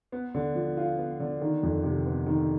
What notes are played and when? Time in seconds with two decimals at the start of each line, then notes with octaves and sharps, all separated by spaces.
0.12 B3
0.35 D3
0.55 F3
0.77 F4
0.98 B3
1.20 D3
1.41 D#3
1.63 F2
1.83 C3
2.05 B3
2.26 D#3